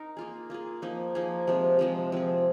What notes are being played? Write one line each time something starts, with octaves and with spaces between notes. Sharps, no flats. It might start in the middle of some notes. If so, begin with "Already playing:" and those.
Already playing: D#4 A#4
A#3 F4 G#4
A#3 F4 G#4
F3 A#3 D#4 G#4
F3 A#3 D#4 G#4
C3 F3 G#3
C3 F3 G#3
F3 C4 G#4